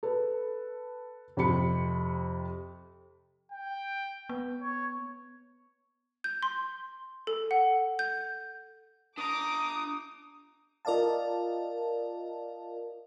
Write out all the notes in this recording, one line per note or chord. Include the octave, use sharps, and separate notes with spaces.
A4 B4
F2 C3 B5 C#7
G5
B3
C#5
G6
C6
A4
F#5
G6
D4 A#5 D6 D#6
F4 A#4 D5 D#5 F5 A5